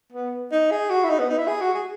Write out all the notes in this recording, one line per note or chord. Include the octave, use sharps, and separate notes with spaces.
B3
D#4
G#4
F#4
E4
D#4
B3
D#4
E4
G#4
F#4
G#4